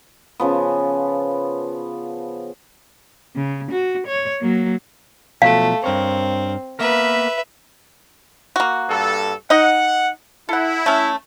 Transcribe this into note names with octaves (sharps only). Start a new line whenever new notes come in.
C#3 F3 B3
C#3
F#4
C#5
F#3 A#3
B2 F3 F#3 A3 F5
G2 C4 A#4 C#5
A#3 B3 A#4 B4 E5
A#3 F#4
G2 A4
D#4 D#5 F#5
E4 A4 F#5
A3 C#4